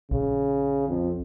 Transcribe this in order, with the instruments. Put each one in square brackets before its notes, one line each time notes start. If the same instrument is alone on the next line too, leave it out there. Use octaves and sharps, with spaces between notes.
[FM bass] A#1 [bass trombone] C#3
[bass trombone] F2